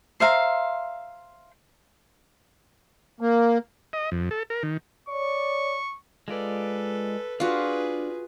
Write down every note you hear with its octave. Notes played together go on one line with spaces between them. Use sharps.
C5 E5 F5 A#5
A#3
D#5
F2
A4
A#4
D#3
C#5 D5 C#6
G#3 F4 A4 B4 D5
D4 F4 F#4 G#4 B4